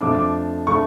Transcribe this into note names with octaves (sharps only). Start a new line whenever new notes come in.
F2 F3 A3 D4 D6
D6
F3 A3 D4 C#6